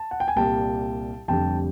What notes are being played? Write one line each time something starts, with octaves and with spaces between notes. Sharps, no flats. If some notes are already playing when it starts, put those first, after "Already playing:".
Already playing: A5
F#5
G5
G#5
C2 A#2 G3 G5 A5
F1 F2 D3 G3 G5 A5